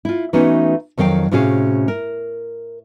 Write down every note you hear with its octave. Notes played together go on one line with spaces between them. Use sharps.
E4 F4
E3 A3 B3 C#4 D#4 F#4
F2 D#3 F#3 F5 G5
A2 C3 C#4 F#4 G#4 F5
A#4